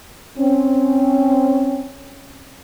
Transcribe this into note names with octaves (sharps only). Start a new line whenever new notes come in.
C4 C#4